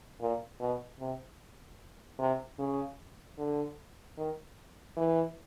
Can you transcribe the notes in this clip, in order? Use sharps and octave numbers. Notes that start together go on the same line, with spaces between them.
A#2
B2
C3
C3
C#3
D3
D#3
E3